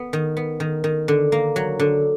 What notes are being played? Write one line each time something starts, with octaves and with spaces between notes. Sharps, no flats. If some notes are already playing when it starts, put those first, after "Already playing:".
Already playing: B3
D#3
B3
D#3
D#3
D3
A#3
F#3
D3